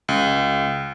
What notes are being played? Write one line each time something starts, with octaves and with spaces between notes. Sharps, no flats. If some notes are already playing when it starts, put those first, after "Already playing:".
C#2